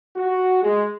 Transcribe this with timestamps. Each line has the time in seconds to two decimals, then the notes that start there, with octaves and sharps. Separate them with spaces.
0.16 F#4
0.63 G#3